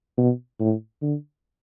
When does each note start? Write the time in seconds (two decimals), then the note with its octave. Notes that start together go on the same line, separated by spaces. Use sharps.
0.18 B2
0.60 A2
1.02 D3